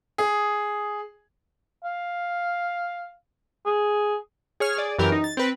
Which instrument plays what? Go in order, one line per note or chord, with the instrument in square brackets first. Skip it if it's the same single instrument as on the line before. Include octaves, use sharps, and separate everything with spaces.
[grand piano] G#4
[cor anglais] F5
G#4
[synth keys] G#4 C#5 F6
G#4 D5
F#2 E3 G4 A#4
D#4
A6
C4 B4